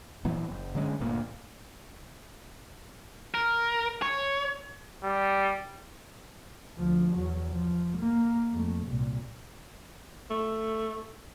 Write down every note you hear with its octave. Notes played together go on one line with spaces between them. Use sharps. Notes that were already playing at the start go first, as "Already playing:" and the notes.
A#2 E3 F#3 B3
F#1
D3 F#3 G#3 C#4
G1 D2 A#2 A#3
A#4
C#5
G3
D2 F3
E2 F#3
F3
A#3
F2 A3
C2 A#2
A3